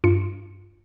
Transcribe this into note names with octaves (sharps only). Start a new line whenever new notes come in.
G2 F4 C#7